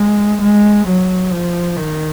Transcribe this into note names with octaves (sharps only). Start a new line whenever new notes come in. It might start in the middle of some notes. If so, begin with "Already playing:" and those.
Already playing: G#3
G#3
F#3
F3
D#3